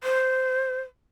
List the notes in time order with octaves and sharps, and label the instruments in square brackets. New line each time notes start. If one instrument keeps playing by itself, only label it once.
[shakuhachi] C5